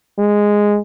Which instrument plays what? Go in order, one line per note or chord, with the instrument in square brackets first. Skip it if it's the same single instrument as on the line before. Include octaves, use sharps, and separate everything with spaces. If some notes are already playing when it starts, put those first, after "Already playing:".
[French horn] G#3